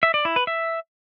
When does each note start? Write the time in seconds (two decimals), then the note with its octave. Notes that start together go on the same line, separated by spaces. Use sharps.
0.03 E5
0.14 D5
0.25 E4
0.36 B4
0.47 E5